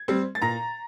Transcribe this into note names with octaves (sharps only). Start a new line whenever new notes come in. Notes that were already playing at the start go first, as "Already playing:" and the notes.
Already playing: G#6
G3 C4
A6
A#2 A#5 A#6